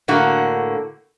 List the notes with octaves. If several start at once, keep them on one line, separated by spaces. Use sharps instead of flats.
A2 D3 A#3 F#4